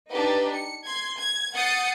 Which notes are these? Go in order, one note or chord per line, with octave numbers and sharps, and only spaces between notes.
D4 D#4 G4 B4
C#7
C6 G#6
G#6
F#5 D#6 G6 A6 C7 C#7